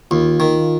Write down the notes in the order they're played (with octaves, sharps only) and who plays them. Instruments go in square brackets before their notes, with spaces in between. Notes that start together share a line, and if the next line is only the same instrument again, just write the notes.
[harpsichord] D#2 [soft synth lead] F4
[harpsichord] D#3